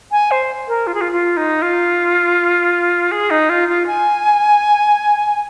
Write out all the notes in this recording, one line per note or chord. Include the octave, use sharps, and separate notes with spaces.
G#5
C5
A#4
F4
G#4
F4
F4
D#4
F4
G#4
D#4
F4
F4
G#5